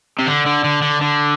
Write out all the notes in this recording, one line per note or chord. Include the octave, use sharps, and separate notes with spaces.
C3
D3
D3
D3
D3
D3